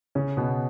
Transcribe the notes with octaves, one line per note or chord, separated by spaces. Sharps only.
C#3 C#4
B2 B3